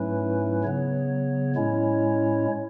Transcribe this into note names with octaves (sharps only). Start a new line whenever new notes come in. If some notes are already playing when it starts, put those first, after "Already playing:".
Already playing: G#2 F#3 A3 C#4 E4 B4
C#3 F#3 B3 C#5
A2 G#3 C#4 E4 C#5